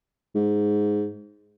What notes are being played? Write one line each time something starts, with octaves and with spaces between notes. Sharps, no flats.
G#2